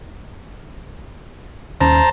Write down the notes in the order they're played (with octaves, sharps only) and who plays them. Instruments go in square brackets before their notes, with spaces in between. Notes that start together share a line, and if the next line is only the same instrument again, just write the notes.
[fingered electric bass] D#2 C#4 [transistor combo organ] C5 A5 A#5